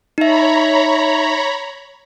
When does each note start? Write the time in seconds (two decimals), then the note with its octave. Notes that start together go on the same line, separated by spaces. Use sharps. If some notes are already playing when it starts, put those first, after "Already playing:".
0.18 D#4 C#5 E5 A#5 B5